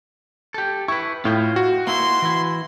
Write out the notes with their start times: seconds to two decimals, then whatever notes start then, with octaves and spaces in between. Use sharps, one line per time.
0.54 G4 A4
0.88 E4 B4 C#6
1.25 A2 F4 G5
1.56 F#4
1.87 A#3 E4 C6
2.22 E3 E4